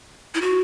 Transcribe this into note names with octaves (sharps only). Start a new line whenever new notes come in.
E4
F#4